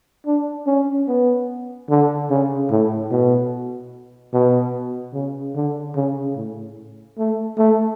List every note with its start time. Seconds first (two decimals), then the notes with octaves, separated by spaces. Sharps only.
0.26 D4
0.67 C#4
1.08 B3
1.90 D3
2.30 C#3
2.70 A2
3.11 B2
4.33 B2
5.14 C#3
5.55 D3
5.96 C#3
6.36 A2
7.18 A3
7.58 A3